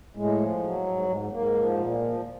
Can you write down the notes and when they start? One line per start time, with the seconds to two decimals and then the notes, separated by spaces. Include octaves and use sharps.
0.16 A2 G#3
0.39 F3
0.63 F#3
0.86 G#2
1.09 G#2 G#3
1.32 G#2 A#3
1.56 F3
1.79 A#2
2.02 F3